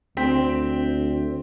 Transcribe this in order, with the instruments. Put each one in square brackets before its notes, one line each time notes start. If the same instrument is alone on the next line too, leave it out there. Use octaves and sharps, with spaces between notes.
[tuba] D2 [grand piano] C4 G5 B6